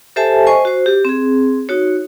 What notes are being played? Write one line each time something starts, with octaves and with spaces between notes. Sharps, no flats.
G4 A4 C5 E5 G#5 A5
C5 D#5 G#5 C#6
F#4 C5
G4
C4 G#4
D#4 F#4 C#5